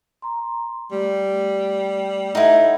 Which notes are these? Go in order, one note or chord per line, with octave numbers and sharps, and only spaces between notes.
A#5 C6
G3 A3
A2 D#4 E4 F#5